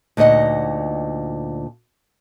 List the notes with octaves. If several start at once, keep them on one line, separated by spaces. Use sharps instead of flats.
D2 A#2 D#4 D#5 F#5